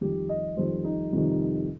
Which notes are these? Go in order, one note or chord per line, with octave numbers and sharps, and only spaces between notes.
F2 D#3 G3 G4
D#5
F2 D#3 G3 C5
D#4
F2 C3 D#3 G3